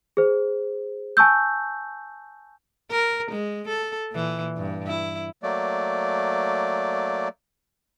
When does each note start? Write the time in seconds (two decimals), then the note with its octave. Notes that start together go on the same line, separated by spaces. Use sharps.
0.17 G#4 C5
1.17 G#5 A5 C#6 E6 G6
2.91 A#4
3.31 G#3
3.68 A4
4.11 A#2 E3
4.57 G2
4.87 E4
5.43 F#3 A3 A#3 D5